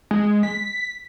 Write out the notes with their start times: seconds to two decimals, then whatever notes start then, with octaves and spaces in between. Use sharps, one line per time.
0.11 G#3
0.43 B6